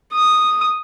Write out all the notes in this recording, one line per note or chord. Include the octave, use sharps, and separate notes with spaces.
D#6